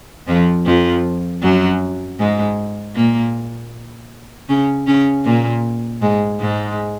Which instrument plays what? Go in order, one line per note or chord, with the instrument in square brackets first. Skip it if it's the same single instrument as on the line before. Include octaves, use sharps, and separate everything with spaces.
[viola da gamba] F2 F3
F2 F3
F#2 F#3
G#2 G#3
A#2 A#3
C#3 C#4
C#3 C#4
A#2 A#3
G#2 G#3
G#2 G#3